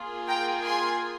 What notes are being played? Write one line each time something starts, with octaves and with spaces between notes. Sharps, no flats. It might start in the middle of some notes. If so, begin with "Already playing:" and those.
Already playing: A#3 F4 G#4
G5 A#5
G#5 C6